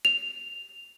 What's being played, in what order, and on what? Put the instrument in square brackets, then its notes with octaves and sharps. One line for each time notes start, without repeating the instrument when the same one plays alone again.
[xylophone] F7